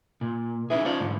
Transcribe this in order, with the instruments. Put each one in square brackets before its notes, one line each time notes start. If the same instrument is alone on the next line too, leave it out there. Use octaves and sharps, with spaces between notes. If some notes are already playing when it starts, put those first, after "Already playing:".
[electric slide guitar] A#2
[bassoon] E3 [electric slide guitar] C#4 D#4 G#4
[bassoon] F3 [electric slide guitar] C#4 D#4 D5
[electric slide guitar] G#2 D3